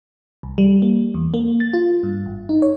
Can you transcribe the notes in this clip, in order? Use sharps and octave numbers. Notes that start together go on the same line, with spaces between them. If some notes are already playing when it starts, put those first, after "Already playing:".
C2
G3
A#3
E2
A#3
A6
F4
G2
G#1
D#4
C#5